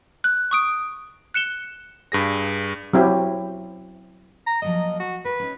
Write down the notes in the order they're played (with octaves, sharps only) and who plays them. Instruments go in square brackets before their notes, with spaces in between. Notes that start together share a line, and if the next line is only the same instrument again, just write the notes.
[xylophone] F#6
C#6 D#6 D7
F#6 C#7 E7 G7
[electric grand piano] G2 G#4 A#6
[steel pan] F#3 C4 E4 G4
[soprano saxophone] A#5
[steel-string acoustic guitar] F3 F#3 A#3 [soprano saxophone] D#5
[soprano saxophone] F#4
[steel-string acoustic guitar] A#4 [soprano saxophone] B4
[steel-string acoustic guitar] C#4 D#4